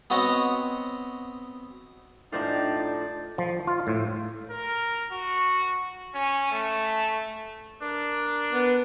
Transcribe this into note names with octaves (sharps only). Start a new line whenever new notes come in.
B3 C4 F#4 C#5 D#5
A2 F3 D4 D#4 C5 D5 F5 A5
F3
F4
A2
A#4
F#4
C#4
A3
D4 A#4
B3